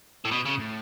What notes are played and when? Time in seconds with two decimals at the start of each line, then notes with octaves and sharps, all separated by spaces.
0.25 A2
0.31 B2
0.45 C#3
0.59 A2